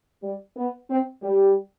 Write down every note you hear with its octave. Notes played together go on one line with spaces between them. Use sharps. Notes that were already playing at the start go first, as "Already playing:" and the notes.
G3
B3
C4
G3